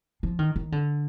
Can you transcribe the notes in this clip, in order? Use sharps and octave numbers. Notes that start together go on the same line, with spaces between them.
F3
D#3
D#3
D3